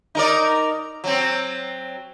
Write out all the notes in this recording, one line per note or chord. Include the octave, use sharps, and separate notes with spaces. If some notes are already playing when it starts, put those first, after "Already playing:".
D#4 A#4 D5
F#3 C4